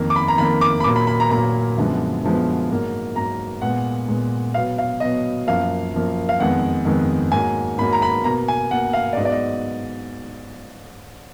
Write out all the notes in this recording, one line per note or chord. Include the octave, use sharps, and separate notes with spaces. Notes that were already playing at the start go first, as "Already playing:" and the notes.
Already playing: F2 D#3 A#3
D6
B5
A#5
F2 D#3 A#3 B5
D6
B5
A#2 F#3 A#3 D6
B5
B5
A#5
A#2 F#3 A#3 A#5
F#2 D3 F3 G#3 B3
F#2 D3 F3 G#3 B3
G#2 F#3 A#3
G#2 F#3 A#3 A#5
A#2 G#3 B3 F#5
A#2 G#3 B3
B2 F#3 B3 F5
F5
B2 F#3 B3 D#5
F#2 F3 A#3 F5
F#2 F3 A#3
F5
F2 D#3 G#3 B3 F#5
F2 D#3 G#3 B3
G#2 F#3 A#3 G#5
G#2 F#3 A#3 B5
A#5
B5
B2 A#3 A#5
G#5
B2 A#3 F#5
F5
D5
G#2 F#3 B3 D#5
D5
D#5